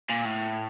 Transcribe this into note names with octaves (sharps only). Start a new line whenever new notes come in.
A#2
A2